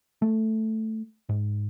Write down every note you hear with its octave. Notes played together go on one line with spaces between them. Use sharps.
A3
G#2